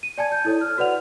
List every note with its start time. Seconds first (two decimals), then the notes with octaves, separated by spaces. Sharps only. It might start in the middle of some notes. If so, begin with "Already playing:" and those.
0.03 D#7
0.18 D5 G#5 A5 G#6
0.32 G6
0.45 E4 A4 C#5
0.61 F6
0.78 F#4 B4 D5 F#5 F7